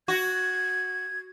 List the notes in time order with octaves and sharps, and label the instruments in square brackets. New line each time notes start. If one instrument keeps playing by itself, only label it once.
[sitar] F#4 [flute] G#6